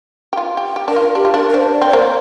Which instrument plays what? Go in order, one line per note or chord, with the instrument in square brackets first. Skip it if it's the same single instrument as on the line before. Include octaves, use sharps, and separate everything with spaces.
[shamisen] G4
F4
G4
G4
[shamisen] D4 [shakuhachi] A#4
[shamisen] F4
[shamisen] D4 [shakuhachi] G4
[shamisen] F4
[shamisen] D4 [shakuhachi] A#4
[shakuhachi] A#4
[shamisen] D4 [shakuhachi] C5
[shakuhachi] D5
[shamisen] C4
[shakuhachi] D5
[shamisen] A#3 [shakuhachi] C5